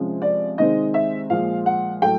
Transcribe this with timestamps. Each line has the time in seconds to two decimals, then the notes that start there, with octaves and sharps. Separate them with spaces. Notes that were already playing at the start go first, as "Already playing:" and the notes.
Already playing: C3 F3 G#3 C#4
0.22 D5
0.58 C3 D#3 G#3 C4 D#4 D#5
0.94 E5
1.30 A#2 F3 G#3 F5
1.66 F#5
2.02 A2 F#3 A3 G5